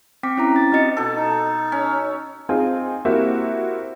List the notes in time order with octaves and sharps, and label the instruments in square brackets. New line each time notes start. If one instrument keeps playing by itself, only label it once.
[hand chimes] C4 G5 D6 B6
C#4 E4 A#5
A6
C4 D#4 F#4 D#5 A6 C#7
[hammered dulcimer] B2 A4
[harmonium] D#4
[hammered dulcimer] C#4
[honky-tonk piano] C4 D#4 F4 G#4
A#3 C4 E4 F#4 G4 E5